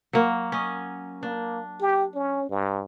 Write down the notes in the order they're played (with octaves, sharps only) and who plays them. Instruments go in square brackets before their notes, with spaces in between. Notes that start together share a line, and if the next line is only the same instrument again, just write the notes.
[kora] F#3 A#3
C#4 D#5
[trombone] A#3 [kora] D4
[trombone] G4
C#4
G2